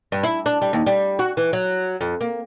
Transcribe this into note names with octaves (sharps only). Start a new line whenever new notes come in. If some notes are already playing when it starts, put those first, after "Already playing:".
G2
E4
D4
G3
D#2
G3
F#4
E3
F#3
F2
A#3